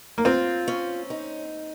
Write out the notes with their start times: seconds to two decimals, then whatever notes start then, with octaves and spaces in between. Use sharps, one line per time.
0.18 A#3
0.25 C4 F4
0.68 C#4
1.10 D#4